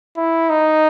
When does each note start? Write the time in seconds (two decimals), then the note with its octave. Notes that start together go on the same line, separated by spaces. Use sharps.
0.17 E4
0.50 D#4